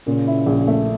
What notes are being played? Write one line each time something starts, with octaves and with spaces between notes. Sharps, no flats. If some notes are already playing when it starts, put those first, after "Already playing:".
A#2 C#3
E4
A#1
A3